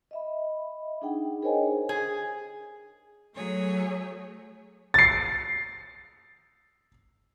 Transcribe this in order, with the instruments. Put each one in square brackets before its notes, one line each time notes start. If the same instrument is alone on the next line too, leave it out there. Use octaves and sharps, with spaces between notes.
[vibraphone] D#5 E5 B5
D4 D#4 G#4 F#5 G5
G#4 A#4 C5 C#5 D#5 G#5
[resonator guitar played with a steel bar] G#4
[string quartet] F#3 A3 G#4 C#5
[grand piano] A6 C7